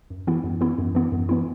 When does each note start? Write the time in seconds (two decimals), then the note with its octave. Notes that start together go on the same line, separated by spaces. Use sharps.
0.10 F#2
0.27 E3 B3 E4
0.44 F#2
0.61 E3 B3 E4
0.78 F#2
0.95 E3 B3 E4
1.12 F#2
1.29 E3 B3 E4